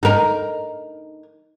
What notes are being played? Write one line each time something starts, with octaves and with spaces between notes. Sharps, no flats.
D#4 A#4